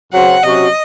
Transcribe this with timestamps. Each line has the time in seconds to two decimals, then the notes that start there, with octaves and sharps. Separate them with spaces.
0.12 F#2 C#3 F#3 C4 F#5
0.43 C3 F#3 C#4 F#4 D#5